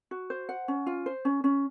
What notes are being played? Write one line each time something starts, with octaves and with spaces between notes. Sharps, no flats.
F#4
C5
F#5
C#4
F4
C5
C#4
C#4